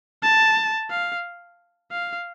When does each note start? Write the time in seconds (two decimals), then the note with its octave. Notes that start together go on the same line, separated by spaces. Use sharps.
0.22 A5
0.91 F5
1.92 F5